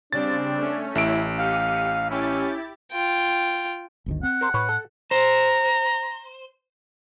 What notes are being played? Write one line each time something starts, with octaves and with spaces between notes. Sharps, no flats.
C#3 G3 C4 D4 A6
A3 C#4
A1 E4 D7
G4 F5 C#7 D#7
C#4 E4 G4 A6
F4 G5
G1 D2 D#3
C4 F#5
A#4 C5
A2 B4 C#5
A4
C5 A#5